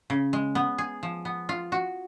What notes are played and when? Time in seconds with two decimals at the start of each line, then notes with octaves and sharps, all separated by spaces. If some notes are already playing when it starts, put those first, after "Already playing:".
0.10 C#3
0.33 G#3
0.55 B3
0.78 G#4
1.03 F3
1.25 B3
1.49 F4
1.72 F#4